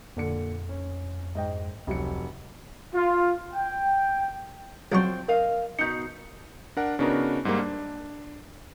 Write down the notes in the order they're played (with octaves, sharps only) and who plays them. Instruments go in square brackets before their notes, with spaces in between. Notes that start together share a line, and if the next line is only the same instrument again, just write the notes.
[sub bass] F2 [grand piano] A#2 D3 C#7
[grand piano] C#4
G#2 D#5 G5
[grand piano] F1 F#3 C#7 [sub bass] C#2
[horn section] F4
G5
[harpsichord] C2 F#3 C#6 [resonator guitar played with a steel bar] F3 C4
[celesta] A#4 [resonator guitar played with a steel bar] D#5 F5
[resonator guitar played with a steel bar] B2 D#4 [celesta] G6 C#7
[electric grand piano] D4 A#4 F#5
C#3 B3 D4 D#4 F#4 A#4
G#2 G3 A#3
D4